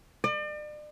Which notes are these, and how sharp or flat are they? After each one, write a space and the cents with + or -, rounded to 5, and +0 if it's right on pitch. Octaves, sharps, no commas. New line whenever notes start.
D5 +40